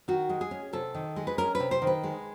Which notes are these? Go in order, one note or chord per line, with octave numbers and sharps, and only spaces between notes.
D#3 F#4
G#3
G#4
C#4
C3 A4
D#3
G#3
B4
C#4 A#4
B4
C3
C5
D#3
B4
G#3